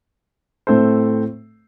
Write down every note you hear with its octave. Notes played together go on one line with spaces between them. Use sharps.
A2 A3 C4 A4 C5